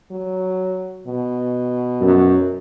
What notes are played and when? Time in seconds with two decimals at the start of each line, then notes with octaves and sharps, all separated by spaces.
0.11 F#3
1.07 B2
2.01 F#2